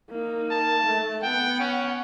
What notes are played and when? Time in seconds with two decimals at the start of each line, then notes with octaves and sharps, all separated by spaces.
0.10 A#3 D#4
0.51 A5
0.86 A3
1.22 B3 F#5 G5
1.60 C#4